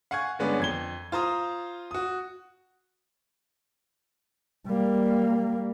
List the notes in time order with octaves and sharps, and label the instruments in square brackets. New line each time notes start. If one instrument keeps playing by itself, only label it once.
[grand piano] F5 F#5 G#5 C#6 G#6
G2 D3 G#3 B3 C#4 D4
F2 G#6 G7
F4 C5 A#5 D#6
F#4 D#6
[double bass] G3 A#3